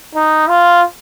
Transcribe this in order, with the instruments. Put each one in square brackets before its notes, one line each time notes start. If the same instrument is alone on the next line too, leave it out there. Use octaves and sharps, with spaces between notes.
[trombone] D#4
F4